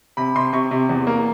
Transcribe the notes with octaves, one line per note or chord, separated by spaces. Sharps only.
C3 B5
C3 C6
C3 C#6
C3
E2
A#3